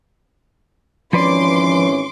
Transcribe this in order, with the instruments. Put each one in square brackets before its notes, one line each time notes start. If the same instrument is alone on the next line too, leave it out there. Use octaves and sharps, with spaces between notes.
[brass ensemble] G#1 E3 C#4 [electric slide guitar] F3 B4 D5 [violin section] C6 D6